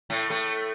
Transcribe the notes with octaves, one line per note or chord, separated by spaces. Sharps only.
A2 A3
A2 A3